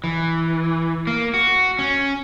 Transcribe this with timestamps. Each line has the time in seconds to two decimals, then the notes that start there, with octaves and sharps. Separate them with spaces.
0.04 E3
1.07 A#3
1.34 F#4
1.79 C#4